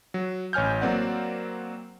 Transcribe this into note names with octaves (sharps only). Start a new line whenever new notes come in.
F#3
A1 C#5 G#5 F6 G6
F#3 A#3 C4 D5 F#5